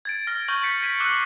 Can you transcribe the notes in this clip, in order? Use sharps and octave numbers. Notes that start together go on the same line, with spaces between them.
G#6 A6 D7
F6 A#6
C#6 F6 G6 A#6 D7 F#7
G6 A6 B6 C#7
G#6 B6 D#7
D6 E6 F#6 C7 F#7 G7